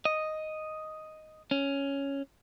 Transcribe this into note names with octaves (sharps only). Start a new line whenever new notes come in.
D#5
C#4